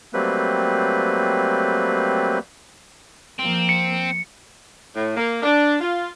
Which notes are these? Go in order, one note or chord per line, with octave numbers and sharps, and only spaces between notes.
F#3 G3 A3 A#3 C4 B4
F3 A#3 C4
C#7
A2
A#3
D4
F4